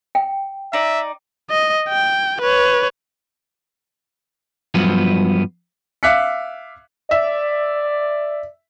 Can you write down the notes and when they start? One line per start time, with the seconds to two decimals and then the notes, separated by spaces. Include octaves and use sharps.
0.15 G5
0.73 D#4 D5 E5
1.50 D#5
1.89 G5
2.41 B4 C#5
4.74 G2 F3 F#3 B3
6.03 E5 F5 D6 F#6 B6 C#7
7.11 D5 E5